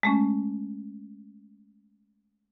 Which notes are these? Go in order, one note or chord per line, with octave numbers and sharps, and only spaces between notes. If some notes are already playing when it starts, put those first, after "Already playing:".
G#3 A3 C#4